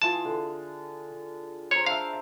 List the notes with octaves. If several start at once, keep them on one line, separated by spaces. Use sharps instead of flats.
E3 F4 G#4 A5
D3
A#4 C5 C#5
D4 E5 F5